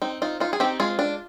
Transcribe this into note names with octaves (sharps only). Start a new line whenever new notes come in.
C4 D#4
D#4 F4
D#4 F4
G#4
C4 D#4 G4
G#3 F4 G#4
D4